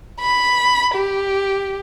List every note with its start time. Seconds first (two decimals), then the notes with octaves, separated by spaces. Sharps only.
0.20 B5
0.95 G4